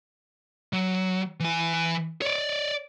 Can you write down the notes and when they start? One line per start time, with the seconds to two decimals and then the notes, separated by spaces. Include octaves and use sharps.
0.73 F#3
1.40 E3 G#5
2.22 C#5 D5